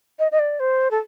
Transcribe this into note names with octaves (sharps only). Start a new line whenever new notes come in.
D#5
D#5
D5
C5
A4